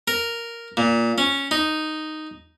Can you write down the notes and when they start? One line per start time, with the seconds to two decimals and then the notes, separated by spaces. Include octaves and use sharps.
0.08 A#4
0.77 A#2
1.18 C#4
1.51 D#4